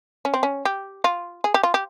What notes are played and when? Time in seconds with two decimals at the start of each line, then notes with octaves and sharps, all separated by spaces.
0.25 C#4
0.34 C4
0.43 C#4
0.65 G4
1.04 F4
1.44 G#4
1.54 G4
1.63 F4
1.74 G4